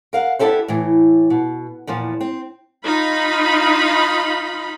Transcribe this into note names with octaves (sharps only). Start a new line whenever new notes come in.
A#4 F5 F#5
B3 D4 E4 G4 A4 C5
A2 E3
B2
E2 A#2 F3
C4
D#4 F4 B5